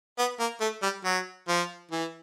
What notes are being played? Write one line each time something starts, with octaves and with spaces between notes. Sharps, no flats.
B3
A#3
A3
G3
F#3
F3
E3